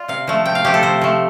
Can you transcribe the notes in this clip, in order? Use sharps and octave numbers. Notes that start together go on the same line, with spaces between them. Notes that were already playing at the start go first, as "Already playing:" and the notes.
Already playing: F4 D5
C3 F5
F3 A3
C3 G5
F5
F3 A3 G4
A4
C3 C5
F3 A3